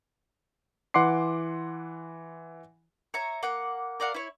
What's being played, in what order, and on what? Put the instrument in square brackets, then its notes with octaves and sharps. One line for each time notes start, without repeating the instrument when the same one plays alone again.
[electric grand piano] E3 F#5 C6 D6 C7
[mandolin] C#5 E5 A#5
A#3 F#5 D6
A#4 D5 F5 F#5
E4 C#5